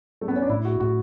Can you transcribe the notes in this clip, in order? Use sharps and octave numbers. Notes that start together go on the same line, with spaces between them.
A3
B3
C#4
D4
A2 E4
F#4
A2 F#4